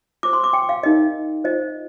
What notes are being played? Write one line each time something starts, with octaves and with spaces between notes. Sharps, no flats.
F4 C5 D6
C6
D6
G5
F5
D#4 G4 A#4 D#5
F4 C5 D#5